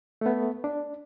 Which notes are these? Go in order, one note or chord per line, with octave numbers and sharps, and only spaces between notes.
A3 B3
D4